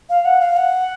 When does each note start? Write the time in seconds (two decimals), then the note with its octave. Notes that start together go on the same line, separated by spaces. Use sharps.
0.09 F5
0.25 F#5
0.40 F5
0.56 F#5